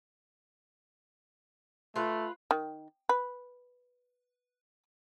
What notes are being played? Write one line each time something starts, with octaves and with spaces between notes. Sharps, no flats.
A3 F4 B4
D#3
B4